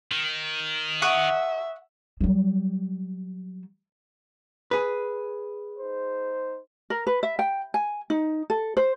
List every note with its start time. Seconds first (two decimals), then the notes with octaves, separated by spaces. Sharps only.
0.11 D#3
1.02 E5 F#5 C#6 D#6
2.21 F#3 G3
4.71 G#4 B4
5.79 D#4 C5
6.90 A#4
7.07 B4
7.23 E5
7.39 G5
7.74 G#5
8.10 D#4
8.50 A4
8.77 C5